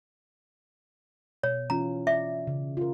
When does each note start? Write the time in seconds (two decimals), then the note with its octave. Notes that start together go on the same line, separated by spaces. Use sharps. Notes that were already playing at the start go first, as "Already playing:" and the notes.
1.43 B2 C#5
1.70 E3 C#4 F4 A#5
2.07 D5 E5
2.47 C#3
2.77 F4 A#4